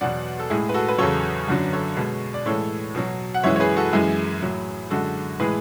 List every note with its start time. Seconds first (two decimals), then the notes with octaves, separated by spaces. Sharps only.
0.01 E2 B2 F#3 D5 F#5
0.39 A4
0.50 A2 G#3 E4 G#4
0.69 B4
0.74 F#4 A4
0.88 B4
0.98 E2 C#3 F#3 A4 C#5
1.48 F#2 D3 F#3
1.73 A4 C#5
1.96 B2 G#3
2.34 D5
2.46 A2 E3 G#3 A4 C#5
2.95 B2 F#3
3.34 F#5
3.43 F#2 E3 G#3 C#5 E5
3.56 C#5
3.60 G#4 B4
3.77 F#4 A4
3.93 F#2 E3 G#3 E4 G#4
4.42 A2 F#3
4.90 F#2 D3 G#3 F#4 A4
5.39 A2 E3 G#3 G#4 B4